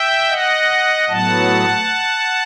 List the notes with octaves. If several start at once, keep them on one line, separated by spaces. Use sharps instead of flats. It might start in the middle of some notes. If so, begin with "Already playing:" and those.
Already playing: E5 G5
D#5 F#5
A2 F#3 B3 F#5 A5